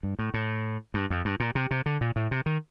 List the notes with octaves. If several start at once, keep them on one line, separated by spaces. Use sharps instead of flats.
G2
A2
A2
G2
F2
G2
A#2
C3
C3
D3
A#2
A2
C3
D#3